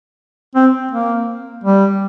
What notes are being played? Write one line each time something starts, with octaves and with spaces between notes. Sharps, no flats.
C4
A#3
G3